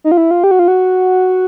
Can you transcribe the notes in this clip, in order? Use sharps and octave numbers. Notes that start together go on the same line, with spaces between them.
D#4
F4
E4
F4
G4
F#4
F4
F#4